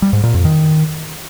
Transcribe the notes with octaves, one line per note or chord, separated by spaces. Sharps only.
G3
G#2
A#2
F2
D#3